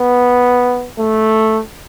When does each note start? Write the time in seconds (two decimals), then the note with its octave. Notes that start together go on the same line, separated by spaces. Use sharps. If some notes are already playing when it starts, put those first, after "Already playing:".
Already playing: B3
0.99 A3